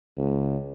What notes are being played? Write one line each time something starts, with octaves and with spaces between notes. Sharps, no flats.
C#2